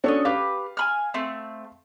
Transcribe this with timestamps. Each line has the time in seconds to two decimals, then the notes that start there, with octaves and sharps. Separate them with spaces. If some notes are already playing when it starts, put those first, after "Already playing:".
0.04 C#4 D4 F#4 A4 C#5 D#5
0.25 G4 B4 F5
0.77 G#5 B5 F6
1.14 A3 C4